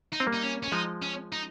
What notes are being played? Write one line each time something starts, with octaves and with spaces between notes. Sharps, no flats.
D#4
C4
G3 A#3
D#4
C#4
C#4
F3 G#3 D#4
C#4
D#4